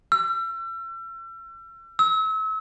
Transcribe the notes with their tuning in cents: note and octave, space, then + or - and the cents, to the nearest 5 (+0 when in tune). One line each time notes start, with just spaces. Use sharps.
E6 +40
E6 -35